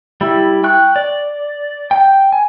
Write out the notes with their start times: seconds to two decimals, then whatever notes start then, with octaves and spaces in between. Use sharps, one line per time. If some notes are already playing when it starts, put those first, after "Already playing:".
0.21 G3 E4
0.64 G5 C#6 F#6
0.96 D5
1.91 G5
2.32 G#5